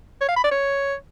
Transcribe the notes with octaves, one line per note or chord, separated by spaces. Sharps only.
C#5
F5
B5
D5
C#5